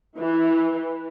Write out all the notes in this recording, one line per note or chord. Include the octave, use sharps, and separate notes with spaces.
E3